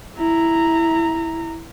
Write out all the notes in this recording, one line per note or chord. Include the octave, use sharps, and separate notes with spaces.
E4 A#5